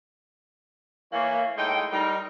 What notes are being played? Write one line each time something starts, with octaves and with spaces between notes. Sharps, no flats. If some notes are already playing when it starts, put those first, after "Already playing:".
E3 A#3 C#5
A2 G#3 D#4 G5
G3 D#4 A#4